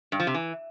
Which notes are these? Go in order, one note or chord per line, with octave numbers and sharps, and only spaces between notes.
G2
F3
C3
E3